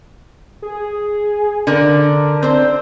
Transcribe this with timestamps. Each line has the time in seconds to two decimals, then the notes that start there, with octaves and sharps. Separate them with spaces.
0.62 G#4
1.67 D3 D4 A#4
2.43 C4 C5